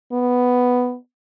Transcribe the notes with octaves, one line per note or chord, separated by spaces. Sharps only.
B3